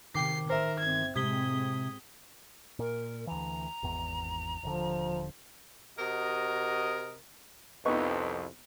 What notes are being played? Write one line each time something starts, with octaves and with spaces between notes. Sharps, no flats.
C3 D#3 G5 D6 C7
A1 A#4 C5 E5
G1 C4 G#6
A2 C3 G#3 C4 D#6 G#6 B6 G7
A#2 A#4
D2 E3 A#5
G#1 E2
D#1 D3 F3
C3 F#4 A#4 D#5
C2 F2 B3 D#4 C#6